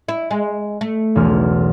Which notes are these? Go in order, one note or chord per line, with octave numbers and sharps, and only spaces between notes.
E4
G#3
A3
E1 B1 F6